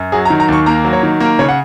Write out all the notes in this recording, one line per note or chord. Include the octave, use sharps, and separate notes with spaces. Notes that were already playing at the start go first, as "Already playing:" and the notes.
Already playing: F#2
F#3 G#4
A#5
D#3
A#5
D#2 C#6
A#3 A#5
F#3
C#5
D#3
A#3 A#4
C#3 C#5
F#5